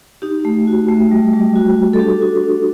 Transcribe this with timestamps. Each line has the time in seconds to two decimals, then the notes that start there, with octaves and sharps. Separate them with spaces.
0.22 D#4 G4
0.45 A3
0.67 F#4
0.89 A3
1.11 G3
1.33 G3
1.56 F#4
1.77 F#4
1.93 A4
1.99 D4 G4
2.22 F#4
2.44 D4